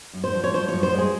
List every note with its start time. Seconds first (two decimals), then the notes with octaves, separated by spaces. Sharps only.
0.13 F#2
0.24 C5
0.34 F3
0.44 C#5
0.54 F3 C5
0.68 F#2 C#5
0.83 C5
0.94 G#3 G#4